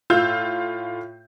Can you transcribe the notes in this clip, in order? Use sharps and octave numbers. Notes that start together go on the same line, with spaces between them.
A2 F4 E6 G6